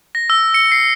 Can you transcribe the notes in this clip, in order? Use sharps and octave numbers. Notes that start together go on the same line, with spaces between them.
A#6
E6
C#7
C7